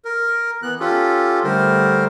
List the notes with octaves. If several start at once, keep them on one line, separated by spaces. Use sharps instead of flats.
A#4
E3 B3 F#6
C#4 F4 G4 A4
D3 G3 A3 A#4 C5